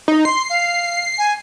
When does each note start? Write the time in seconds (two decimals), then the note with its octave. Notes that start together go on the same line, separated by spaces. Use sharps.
0.08 D#4
0.25 C6 C7
0.50 F5
1.18 G#5